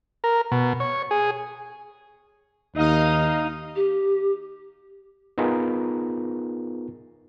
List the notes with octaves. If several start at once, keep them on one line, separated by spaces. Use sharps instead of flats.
A#4
B2
C#5
G#4
D#2 D#4 D#5 F5 D#6
G4
B3 D#4 F4 G#4 A#4 B4